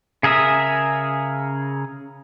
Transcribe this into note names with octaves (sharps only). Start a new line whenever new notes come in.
C#3 G#4 A#4 E5 D#6